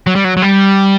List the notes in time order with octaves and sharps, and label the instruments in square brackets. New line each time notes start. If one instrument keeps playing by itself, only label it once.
[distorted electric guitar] F#3
G3
F#3
F#3
G3